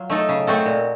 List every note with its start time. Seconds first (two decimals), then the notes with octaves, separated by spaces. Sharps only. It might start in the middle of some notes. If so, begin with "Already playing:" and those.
Already playing: F#3 F4
0.10 A3 D#4 A4
0.29 C#3
0.47 A3 C4 F#4 A4
0.65 A#2